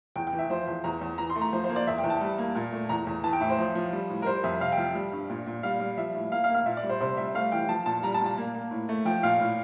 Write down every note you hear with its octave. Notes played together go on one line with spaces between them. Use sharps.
E2 G5
G5
E3
E5
F3 C5
E2
E2 A#5
E2
E3 A#5
C6
A3
A#5
F3 C5
C5
A#3
D5
E2 E5
G5
E2
A5
G3
A#3
A#2
A3
E2 A#5
E2
E3 A5
G5
A2 E5
C5
F3
F3
G3
A2
A#4
G3 C5
F2 E5
C3 F5
G5
F3
G3
G2
A#2
A#2
G3 F5
G3
F3 E5
A2
A#3 F5
F5
A#3
F5
A#2 E5
D5
G3
C5
C3 C5
G3 E5
A3 F5
E3 G5
F3 A5
A#2 A5
G3 A#5
A5
A#2
A5
A#3
A#3
A2
A3
F3 G5
A#2 F5
A2